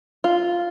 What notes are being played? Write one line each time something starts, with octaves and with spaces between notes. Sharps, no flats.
F4